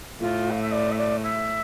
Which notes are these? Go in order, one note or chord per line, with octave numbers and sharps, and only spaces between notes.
A2 F4
F5
E5
D5
E5
D5
E5